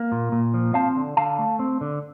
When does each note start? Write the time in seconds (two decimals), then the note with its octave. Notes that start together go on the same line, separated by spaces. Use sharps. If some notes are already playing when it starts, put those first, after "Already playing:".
Already playing: A#3
0.12 A#2
0.32 A#2
0.54 F3
0.74 C4 F5 A5
0.97 D3
1.17 D3 F5 A5
1.39 A3
1.59 C4
1.81 D3